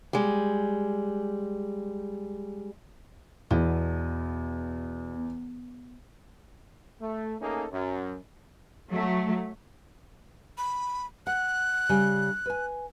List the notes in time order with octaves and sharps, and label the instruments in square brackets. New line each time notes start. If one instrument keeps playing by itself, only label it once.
[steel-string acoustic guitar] G3 G#3
[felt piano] E2 [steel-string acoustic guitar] B2
[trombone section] A3
A3 A#3 C#4 D#4 G#4 A4
F#2
[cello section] F#3 A3
[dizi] B5
[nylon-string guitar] F#5 [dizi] F#6
[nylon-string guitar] C#3 G3 G#5
B4 G#5